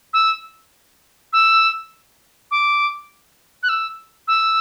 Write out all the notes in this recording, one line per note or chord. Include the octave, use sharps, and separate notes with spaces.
E6
E6
D6
F#6
E6
E6